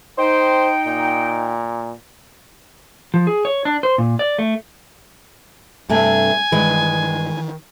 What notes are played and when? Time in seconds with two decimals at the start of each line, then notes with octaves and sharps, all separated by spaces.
0.18 D#4 C5 G5
0.87 A#2
3.14 F3
3.27 G#4
3.45 C#5
3.65 D4
3.83 C5
3.98 A#2
4.19 D5
4.39 A3
5.90 G2 C3 A3 D4 G#5
6.52 G2 D#3 E3 G#3 B4